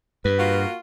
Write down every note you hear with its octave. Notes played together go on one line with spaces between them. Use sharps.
G2 B4
A#3 F4 F#4